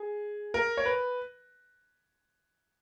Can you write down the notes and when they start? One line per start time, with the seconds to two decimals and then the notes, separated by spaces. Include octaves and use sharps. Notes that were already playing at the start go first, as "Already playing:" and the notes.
Already playing: G#4
0.54 A#4
0.77 C#5
0.86 B4